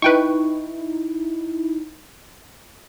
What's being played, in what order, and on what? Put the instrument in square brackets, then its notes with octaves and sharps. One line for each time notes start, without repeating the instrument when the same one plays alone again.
[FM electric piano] D#4 E4 [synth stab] B4 G5 C#6